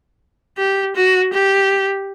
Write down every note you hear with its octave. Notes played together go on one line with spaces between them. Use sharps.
G4
F#4
G4